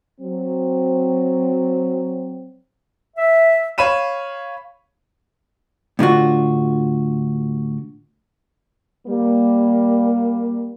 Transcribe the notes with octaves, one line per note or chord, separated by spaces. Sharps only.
F#3 C4
E5
C#5 F5 B5 D#7 E7
A2 D3 F4 F#4
G3 A#3